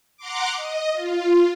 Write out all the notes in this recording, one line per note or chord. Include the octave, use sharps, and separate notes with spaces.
F#5 A#5 C6 D6
D#5
F4